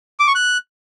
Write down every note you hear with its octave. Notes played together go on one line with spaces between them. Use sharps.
D6
C#6
F#6